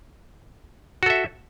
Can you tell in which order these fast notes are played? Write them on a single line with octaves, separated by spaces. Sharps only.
F#4 A4 E5